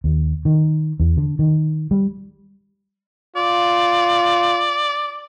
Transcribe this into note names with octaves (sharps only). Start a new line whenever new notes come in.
D#2
D#3
E2
D3
D#3
G3
F4 D5